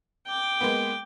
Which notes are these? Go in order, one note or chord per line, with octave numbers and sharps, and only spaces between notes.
G5 D6
G#3 A#3 B3